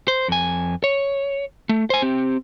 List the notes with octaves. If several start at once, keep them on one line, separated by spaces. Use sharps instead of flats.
C5
F2 G#5
C#5
A3
C5 G#5
C4 G4